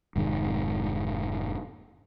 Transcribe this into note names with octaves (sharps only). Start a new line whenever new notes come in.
F1 G#2 D#3